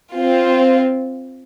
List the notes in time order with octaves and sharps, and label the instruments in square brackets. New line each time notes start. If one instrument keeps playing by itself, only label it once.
[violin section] C4 F4